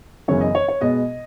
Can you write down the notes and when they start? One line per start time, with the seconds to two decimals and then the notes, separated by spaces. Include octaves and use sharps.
0.28 F#2 C#3 E3 B3 C#5
0.41 D#5
0.55 C#5
0.68 C#5
0.81 B2 G#3 B3 D#5